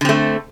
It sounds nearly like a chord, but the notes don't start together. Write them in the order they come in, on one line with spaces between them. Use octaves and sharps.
D3 C4 A3